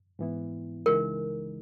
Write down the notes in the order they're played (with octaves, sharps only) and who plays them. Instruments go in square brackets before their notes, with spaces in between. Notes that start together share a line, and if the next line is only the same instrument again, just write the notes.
[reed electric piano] G#2 E3 B3 E4
[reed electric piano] C#2 C#3 E3 G#3 D#4 [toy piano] A#4